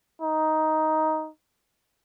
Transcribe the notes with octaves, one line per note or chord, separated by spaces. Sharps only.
D#4